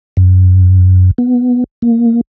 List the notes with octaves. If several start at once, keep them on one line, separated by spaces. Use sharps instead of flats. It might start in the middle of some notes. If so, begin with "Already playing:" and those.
F#2
B3
A#3